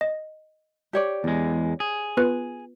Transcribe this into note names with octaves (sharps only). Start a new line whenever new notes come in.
D#5
G4 C#5 D5
E2 G#3
G#4
B3 F4 B4